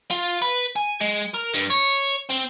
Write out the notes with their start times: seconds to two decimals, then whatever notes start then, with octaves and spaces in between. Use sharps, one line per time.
0.10 F4
0.42 B4
0.76 G#5
1.01 G#3
1.34 A#4
1.54 G2
1.70 C#5
2.30 C4